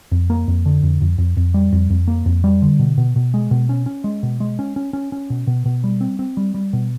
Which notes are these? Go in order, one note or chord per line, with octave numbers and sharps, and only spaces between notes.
F2
A#3
F2
D3
F2
F2
F2
F2
G3
F2
F2
A#3
F2
G3
D3
B2
B2
B2
G#3
B2
C#4
C#4
G#3
B2
G#3
C#4
C#4
C#4
C#4
B2
B2
B2
G3
C4
C4
G3
G3
B2